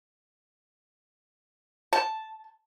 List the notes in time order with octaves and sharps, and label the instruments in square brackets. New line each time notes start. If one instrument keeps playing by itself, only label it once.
[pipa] A5